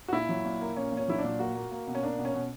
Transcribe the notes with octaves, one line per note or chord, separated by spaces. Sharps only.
F#4
A#2 E4
F#3
A#2
A#3
A#2 C#4
A#2
C#4
F#3 E4
D4
A#2
A#3 F#4
A#3
A#3
B2
C#4
A#3 D4
B2
C#4
B2